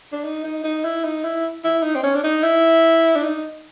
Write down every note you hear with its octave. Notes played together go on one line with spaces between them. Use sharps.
D4
D#4
D#4
D#4
E4
D#4
E4
E4
D#4
C4
C#4
D4
D#4
E4
D4
D#4